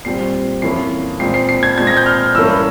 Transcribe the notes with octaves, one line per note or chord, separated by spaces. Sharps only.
A#2 G3 C4 C7
F2 E3 A#3 C#4 C7
A#2 G#3 C4 C7
C7
C7
G#6
A#2 G#3 C4 G#6
A#6
G6
F6
G2 E3 A#3 C#4 E6